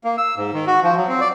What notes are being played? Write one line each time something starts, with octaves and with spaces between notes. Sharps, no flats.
A#3
E6
G#2
D#3
F#4
F3
F#3
C4
D5